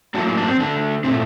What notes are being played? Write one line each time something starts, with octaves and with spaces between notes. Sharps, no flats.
A2 F#3 A#3 D4 F#4
D4
C4
D3 A3 D4
A#2 A3 C4